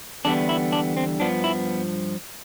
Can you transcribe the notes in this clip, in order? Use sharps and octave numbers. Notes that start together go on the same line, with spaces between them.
E2 D3 G3 B3 D4
E4
D4
C4
G2 F3 B3 D4
E4